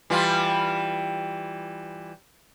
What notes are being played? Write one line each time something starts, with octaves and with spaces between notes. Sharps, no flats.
E3 G3 F4